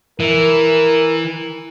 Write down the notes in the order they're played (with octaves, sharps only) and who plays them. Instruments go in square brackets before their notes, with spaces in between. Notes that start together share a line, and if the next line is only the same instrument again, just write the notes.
[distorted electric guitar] E3 [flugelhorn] A#4